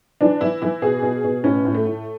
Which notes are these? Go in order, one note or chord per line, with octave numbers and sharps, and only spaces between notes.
E3 D4
E3 E4
E3 E4
B2 G#4
B2
B2
A2 C#4
A2
A3
A2